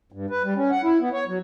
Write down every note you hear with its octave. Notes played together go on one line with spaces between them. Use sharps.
G2
B4
G3
C#4
F#5
E4
B3
C#5
F#3